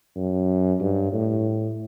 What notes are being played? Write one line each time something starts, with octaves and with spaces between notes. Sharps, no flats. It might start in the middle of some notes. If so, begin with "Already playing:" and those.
F#2
G2
A2